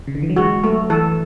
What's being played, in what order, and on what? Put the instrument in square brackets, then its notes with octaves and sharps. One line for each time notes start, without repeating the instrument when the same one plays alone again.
[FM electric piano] C#3
D3
E3
F#3
[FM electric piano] G#3 [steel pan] F#4
[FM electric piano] F#3 [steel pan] A3
[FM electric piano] E3 [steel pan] A4